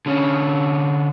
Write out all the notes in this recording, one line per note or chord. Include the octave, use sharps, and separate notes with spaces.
D3 C#4